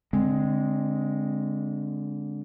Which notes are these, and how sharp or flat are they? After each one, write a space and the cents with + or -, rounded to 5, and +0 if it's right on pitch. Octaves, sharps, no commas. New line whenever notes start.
D3 -20 G#3 +0 C4 +0